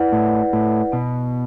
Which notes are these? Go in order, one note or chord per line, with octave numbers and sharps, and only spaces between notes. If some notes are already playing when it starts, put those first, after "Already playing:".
Already playing: E4 B4 D5 F#5
A2 E4
A2 B4 D5 F#5
B2 B3